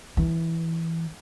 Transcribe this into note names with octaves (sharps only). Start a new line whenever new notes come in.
E3